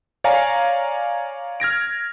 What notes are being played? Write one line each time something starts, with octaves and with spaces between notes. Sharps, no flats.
C#5 D5 F5 G#5 A#5
F6 G#6 A#6 D7